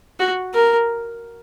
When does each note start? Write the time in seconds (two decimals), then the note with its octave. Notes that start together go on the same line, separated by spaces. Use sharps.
0.19 F#4
0.54 A#4